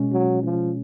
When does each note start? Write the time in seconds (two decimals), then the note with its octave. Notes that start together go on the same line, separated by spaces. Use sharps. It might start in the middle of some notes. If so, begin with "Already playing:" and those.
Already playing: B2 G#3 C#4
0.13 F#3
0.43 F3